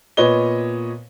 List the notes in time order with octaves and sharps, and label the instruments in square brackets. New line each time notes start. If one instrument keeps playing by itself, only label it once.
[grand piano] A#2 B3 B4 C#5 D#5 G7